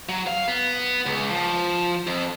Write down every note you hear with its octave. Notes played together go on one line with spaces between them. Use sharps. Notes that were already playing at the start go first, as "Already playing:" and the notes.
F#3
F5
B3
C#2
F3
F2